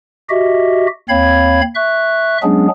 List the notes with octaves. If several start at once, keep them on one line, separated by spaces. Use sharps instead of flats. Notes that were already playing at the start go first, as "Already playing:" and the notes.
F#4 G4 D#5 E5
D#2 C4 C#5 F5 B5 G#6
E5 C#6 F#6
F#3 G#3 B3 C#4 D4 G#4